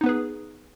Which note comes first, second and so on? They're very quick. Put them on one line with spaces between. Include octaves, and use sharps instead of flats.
D#4 B3 B4 G#4